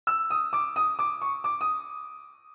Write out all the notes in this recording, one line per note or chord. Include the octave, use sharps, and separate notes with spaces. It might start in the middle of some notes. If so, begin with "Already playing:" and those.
E6
D#6
D6
D#6
D6
C#6
D6
D#6